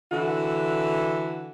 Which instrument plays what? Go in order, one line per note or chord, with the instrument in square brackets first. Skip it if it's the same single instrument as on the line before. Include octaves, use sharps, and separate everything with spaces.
[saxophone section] D3 E3 F#4 A4